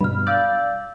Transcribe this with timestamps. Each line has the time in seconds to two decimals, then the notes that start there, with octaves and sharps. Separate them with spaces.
0.01 G2 B2 B5 F6
0.27 D5 F5 E6 G6